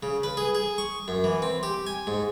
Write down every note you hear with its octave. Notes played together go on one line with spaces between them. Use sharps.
C#3
B4
G#4
G#4
C#6
F#2
E3
C4
G4
G#5
G#2